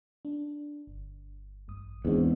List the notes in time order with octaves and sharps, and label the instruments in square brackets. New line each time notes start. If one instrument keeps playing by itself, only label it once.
[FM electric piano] D4
G1
A1 G2 D#6
[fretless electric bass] E2 G#2 [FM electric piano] B3 C4 D4